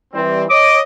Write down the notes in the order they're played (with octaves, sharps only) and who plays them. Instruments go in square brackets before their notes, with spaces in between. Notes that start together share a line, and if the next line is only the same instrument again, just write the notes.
[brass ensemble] E3 G3 C4
[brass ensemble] C#5 D#5 [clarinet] D6